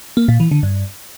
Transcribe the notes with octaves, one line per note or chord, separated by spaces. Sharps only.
A#3
A#2
E3
D3
G2